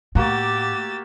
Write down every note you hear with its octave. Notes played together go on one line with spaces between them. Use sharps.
A2 A#3 F#4 G4 E6 A6